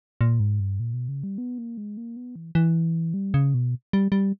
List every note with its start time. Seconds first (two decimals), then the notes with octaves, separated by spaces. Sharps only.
0.21 A#2
0.40 G#2
0.60 G2
0.80 A#2
0.94 B2
1.08 C#3
1.23 G3
1.38 B3
1.58 A#3
1.77 G#3
1.97 A#3
2.16 B3
2.36 E3
2.55 E3
3.14 G3
3.34 C#3
3.54 B2
3.93 G3
4.12 G3